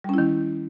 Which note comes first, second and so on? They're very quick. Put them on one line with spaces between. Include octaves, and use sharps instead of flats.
G3 C#4 E4 D#3